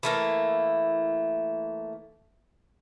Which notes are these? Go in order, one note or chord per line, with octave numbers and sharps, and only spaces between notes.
E3 A3 A#3